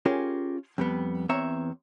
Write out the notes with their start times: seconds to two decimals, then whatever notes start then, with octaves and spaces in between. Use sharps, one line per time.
0.06 C#4 F4 G4 G#4 A#4
0.78 F2 G3 B3
1.29 E2 C4 C#5 E5 A#5